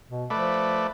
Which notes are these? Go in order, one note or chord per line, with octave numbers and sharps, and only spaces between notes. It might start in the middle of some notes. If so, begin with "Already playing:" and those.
B2
F3 A3 B4 D5